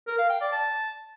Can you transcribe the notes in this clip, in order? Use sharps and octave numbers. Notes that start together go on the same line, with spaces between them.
A#4
F5
G5
D5
A5